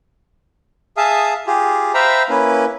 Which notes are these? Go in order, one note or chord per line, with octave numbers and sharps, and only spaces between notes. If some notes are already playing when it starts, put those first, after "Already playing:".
G#4 E5 F5 A5 D#6
F4 G4 G#4
C5 E5 F5 G5 A#5 B5
A#3 C#4 E4 B4